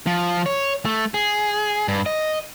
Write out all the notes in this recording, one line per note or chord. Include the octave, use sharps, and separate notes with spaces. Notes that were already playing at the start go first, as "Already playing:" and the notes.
F3
C#5
A3
G#4
G2
D#5